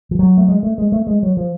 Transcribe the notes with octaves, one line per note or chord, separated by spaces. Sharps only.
F3
F#3
A3
G#3
A3
G#3
A3
G#3
F#3
F3